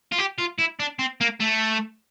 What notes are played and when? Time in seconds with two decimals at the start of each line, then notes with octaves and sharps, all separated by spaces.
0.12 F4
0.18 G4
0.38 F4
0.59 E4
0.80 D4
0.99 C4
1.21 A#3
1.40 A3